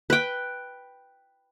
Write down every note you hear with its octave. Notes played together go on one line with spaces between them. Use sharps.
B4 G5